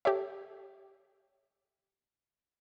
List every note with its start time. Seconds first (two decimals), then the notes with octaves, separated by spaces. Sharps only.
0.05 G4 A4 C#5 E5